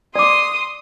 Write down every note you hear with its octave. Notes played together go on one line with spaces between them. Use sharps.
D5 C6 D6 D#6